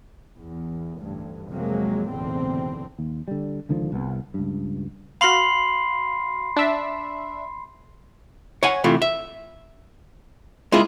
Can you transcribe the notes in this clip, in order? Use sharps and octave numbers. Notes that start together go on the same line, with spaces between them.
E2
A1 D2 G2
F2 C3 F3 F#3 G#3 A#3
F#1 B1 E2 A2 D3 C4
D#2
D3 G3
C#2 D3 D#3 F3
C2 B3
C#2 G2
F#4 F5 B5 C6 C7
D4 E5
C#5 F#5 G#5
C3 E3 A3 F4
E5
G#3 A#3 E4 F4 G#4